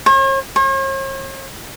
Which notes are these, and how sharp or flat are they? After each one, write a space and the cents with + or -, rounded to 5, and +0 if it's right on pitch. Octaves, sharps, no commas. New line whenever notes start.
C#5 -45
C#5 -45